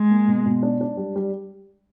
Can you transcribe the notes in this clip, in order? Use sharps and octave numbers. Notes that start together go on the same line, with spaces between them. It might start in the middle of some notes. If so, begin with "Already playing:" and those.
Already playing: G#3
A#3
B2
B2
D4
D4
G3
G3